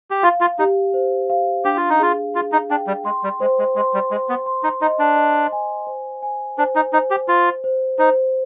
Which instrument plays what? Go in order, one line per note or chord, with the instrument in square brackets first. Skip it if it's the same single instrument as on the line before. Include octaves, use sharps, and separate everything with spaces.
[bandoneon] G4
[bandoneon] F4 [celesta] F5
[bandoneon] F4
[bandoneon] D#4 [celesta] G4
[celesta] C5
F5
[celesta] D4 [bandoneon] G4
[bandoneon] F4
D#4
[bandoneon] F4 [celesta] G#4
[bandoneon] F4 [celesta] G#4
[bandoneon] D#4
[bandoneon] D4 [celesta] G5
[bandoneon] G3
[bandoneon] G#3 [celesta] C6
[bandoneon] G3
[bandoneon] G#3 [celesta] C5
[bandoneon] G#3
[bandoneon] G#3 [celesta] C6
[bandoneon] G3
[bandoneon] G#3 [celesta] C5
[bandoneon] B3
[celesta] C6
[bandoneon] D#4
[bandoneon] D#4 [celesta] D#5
[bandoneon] D4
[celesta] D#5
G#5
C5
G#5
[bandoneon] D4 [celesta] C5
[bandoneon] D#4
[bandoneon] D#4 [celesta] C5
[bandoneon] G4
[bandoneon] F4 [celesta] C5
[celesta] C5
[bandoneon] D#4 [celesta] C5